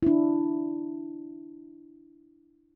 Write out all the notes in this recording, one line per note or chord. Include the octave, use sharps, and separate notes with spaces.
D4 E4